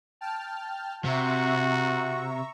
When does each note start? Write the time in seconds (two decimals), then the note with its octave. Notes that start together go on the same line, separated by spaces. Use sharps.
0.21 G5 A5 F6
1.04 C3 F#4 E5 A#5 C#6